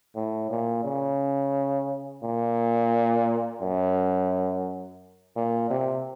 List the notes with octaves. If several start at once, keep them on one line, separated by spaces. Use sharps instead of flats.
A2
A#2
C#3
A#2
F#2
A#2
C3